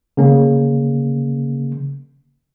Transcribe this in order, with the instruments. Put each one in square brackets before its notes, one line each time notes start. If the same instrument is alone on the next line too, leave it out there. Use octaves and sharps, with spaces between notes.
[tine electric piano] C#3 A#3